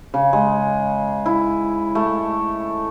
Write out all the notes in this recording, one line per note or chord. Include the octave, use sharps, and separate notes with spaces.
C#3
G#3
E4
A3